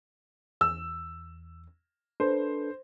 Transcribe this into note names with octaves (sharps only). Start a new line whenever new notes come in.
E2 E6
D4 A4 B4 C5